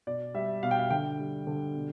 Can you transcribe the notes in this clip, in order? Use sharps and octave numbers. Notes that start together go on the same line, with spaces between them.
B2 D5
G3 E5
B2 F5
G5
F5
D3 G5
G3
D3
B2